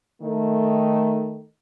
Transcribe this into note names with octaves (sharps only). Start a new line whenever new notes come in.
D#3 A3